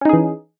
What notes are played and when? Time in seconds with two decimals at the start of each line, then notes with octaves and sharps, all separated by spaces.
0.01 C#4
0.05 D#4
0.09 G#4
0.13 E3